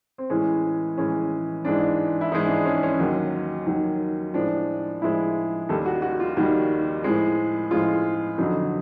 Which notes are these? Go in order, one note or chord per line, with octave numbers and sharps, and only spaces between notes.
C4
A2 E3 G#3 C#4
A2 E3 G#3 C#4
G#2 E3 G#3 D4
E4
G#2 E3 G#3 D#4
D4
C#4
C#4
D#2 D#3 F#3
D#2 D#3 F#3
A2 F3 G#3 D4
A2 F3 G#3 E4
D#2 D#3 G3 A4
F#4
F#4
F4
D#2 D#3 G3 F#4
A2 F3 G#3
A2 F3 G#3 F4
F2 D3 F#3 D#4